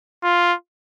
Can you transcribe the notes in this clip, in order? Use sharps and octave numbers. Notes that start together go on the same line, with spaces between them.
F4